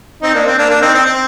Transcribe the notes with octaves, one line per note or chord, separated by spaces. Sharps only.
C4 D#4
A#3 D4
C4
A#3 D4
A#3 D4
C4 D#4
C4
C4